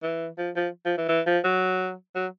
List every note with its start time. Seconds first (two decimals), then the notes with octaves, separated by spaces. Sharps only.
0.03 E3
0.38 F3
0.56 F3
0.85 F3
0.98 E3
1.09 E3
1.26 F3
1.44 F#3
2.15 F#3